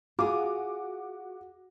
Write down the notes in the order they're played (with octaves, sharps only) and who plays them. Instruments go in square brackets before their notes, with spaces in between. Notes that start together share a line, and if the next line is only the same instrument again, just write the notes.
[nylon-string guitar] F4 G#4 [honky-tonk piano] F#4 D6